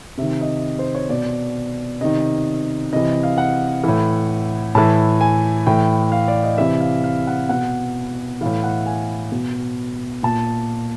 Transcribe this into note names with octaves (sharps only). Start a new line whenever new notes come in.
C3 D#3 E5
D#5
C5
C#5
B2 D5
C3 D#3 D#5
C3 E3 D#5
F5
F#5
A2 E3
A2 E3 A5
G#5
A2 E3 G5
F5
D5
D#5
C3 E3 E5
F5
F5
F#5
B2 F#5
A2 E3 F5
F#5
G#5
B2
A#2 A5